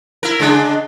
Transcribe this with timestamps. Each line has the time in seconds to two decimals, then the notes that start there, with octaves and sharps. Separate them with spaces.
0.23 E4 A#4
0.39 C#3 G#3 D4